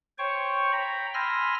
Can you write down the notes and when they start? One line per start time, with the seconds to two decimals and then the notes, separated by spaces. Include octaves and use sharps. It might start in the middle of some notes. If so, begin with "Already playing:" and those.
0.18 C5 C#5 G5 C#6
0.72 G5 A#5 B5
1.14 G#5 B5 C6 E6 F6 A#6